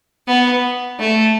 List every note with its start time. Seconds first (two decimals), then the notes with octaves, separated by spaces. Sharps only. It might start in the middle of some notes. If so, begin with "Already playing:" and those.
0.27 B3
1.00 A3